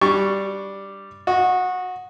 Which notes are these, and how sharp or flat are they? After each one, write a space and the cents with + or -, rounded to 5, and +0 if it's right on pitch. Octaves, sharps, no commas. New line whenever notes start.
G3 +0 D4 +0 C#6 +0
F#4 -20 D#5 +0